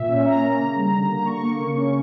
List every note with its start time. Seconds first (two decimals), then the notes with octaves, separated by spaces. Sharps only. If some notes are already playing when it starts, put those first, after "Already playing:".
Already playing: A#2 E5
0.08 C#4
0.25 C#4 A#5
0.42 A#3
0.59 C#3
0.76 G3
0.92 D3
1.09 A#3
1.26 D3 C#6
1.43 A#3
1.60 C#3
1.77 C#4